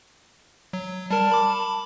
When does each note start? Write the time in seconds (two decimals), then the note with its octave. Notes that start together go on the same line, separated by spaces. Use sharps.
0.73 F#3
1.11 G3 A#4 A5
1.32 B5 D6